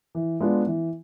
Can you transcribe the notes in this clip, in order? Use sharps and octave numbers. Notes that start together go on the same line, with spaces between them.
E3
G#3 B3 D4 F4
E3